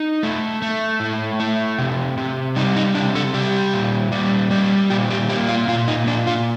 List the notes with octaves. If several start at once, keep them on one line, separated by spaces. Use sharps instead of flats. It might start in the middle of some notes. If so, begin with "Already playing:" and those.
Already playing: D#4
A3
A3
A2
A3
C3
C3
G3 D#4
D#4
C3 D4
A4
G3 G4
A#2
G3
G3
A#2 G4
G4
A#3 G4
F4
A#2 F4
D#4
A#2 D4
F4